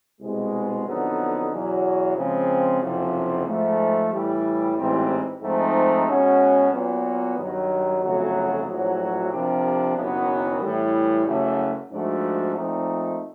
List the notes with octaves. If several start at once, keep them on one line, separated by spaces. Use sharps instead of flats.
C2 B2 G#3
F2 D3 F#3 B3 D#4
E2 B2 F#3
C#3 F3 G#3 C4
F#1 F2 C3 F3
G#2 F3 A3
A2 E3 G3
A1 G#2 E3 G3 C4
G#2 F3 A3 C4 D#4
B2 G#3 C#4 F#4
A#2 F#3 B3
G2 D#3 F#3
G1 F2 C#3 F#3 A3
A#1 A2 F#3
C3 F3 A#3 D4 G4
F#1 F#2 D#3 F#3 B3
A2 E3 G3
F#1 F#2 C#3 F#3 A3
G#2 F3 A3 D4 F#4
A#2 F3 A3 C4 D#4